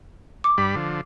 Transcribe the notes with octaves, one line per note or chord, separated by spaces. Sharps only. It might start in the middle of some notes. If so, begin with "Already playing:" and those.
D6
G2 G3 B5
D3 F3